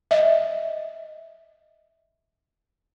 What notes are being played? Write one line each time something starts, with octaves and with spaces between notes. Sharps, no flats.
D#5 E5